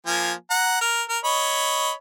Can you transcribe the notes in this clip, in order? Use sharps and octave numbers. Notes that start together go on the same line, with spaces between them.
F3 A#3 G#5
F#5 A#5
A#4
A#4
C#5 D#5 B5